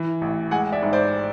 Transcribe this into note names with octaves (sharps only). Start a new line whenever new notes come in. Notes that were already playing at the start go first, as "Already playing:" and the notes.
Already playing: E3
A1
G#3 F#5 G#5
D5 E5
G#2
C5 D5